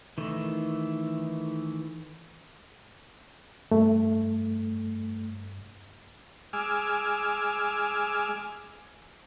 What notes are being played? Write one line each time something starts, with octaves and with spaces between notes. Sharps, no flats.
D#3 E3 A3
G2 A3
G#3 G#5 D6 E6 F6